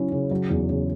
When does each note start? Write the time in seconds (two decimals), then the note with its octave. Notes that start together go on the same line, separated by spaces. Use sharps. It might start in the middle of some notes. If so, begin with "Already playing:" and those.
Already playing: C#3 F#3 C#4 E4
0.12 C#3
0.31 F#3
0.50 E2
0.69 C#3